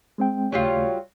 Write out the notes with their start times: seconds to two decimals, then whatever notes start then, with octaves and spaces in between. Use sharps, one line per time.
0.18 G#3 C4 G5
0.52 D#2 C#3 F#3 G3 A3 F4 C#5